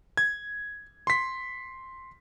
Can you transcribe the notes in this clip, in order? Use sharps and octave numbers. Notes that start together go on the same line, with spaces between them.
G#6
C6 B6